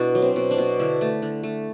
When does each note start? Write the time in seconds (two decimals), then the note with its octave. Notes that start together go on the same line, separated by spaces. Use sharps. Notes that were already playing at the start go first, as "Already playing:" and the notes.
Already playing: B2 B3 D4 E4 F#4
0.15 F#3
0.22 C4
0.36 B2
0.51 D4
0.58 B2
0.80 D3 E4
1.01 A3
1.22 D3
1.43 A3